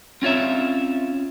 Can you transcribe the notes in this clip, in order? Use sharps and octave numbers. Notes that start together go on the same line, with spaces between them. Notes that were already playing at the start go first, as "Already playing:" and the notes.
C4 C#4 F4 C#5 E5